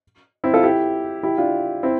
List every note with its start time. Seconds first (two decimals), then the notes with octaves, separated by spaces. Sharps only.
0.44 C4 E4
0.54 F4 A4
0.63 E4 G4
1.23 E4 G4
1.38 D4 F4
1.83 C4 E4